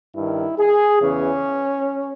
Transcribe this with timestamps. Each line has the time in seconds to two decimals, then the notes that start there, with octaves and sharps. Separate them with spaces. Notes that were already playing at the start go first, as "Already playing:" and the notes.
0.15 G2 D#3 E4
0.57 G#4
1.00 E2 C#3 E3 C#4